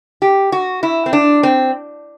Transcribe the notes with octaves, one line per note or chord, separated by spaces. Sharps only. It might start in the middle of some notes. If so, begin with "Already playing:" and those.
G4
F#4
E4
C4
D4
C4